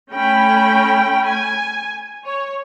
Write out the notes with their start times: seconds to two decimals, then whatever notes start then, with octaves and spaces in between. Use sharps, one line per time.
0.11 A3 C#4 G5 B5
1.26 G#5
2.25 C#5